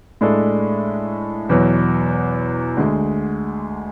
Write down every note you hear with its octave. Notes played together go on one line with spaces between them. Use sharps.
A2 G#3 D4 A4
E2 B2 F#3
D2 D3 G#3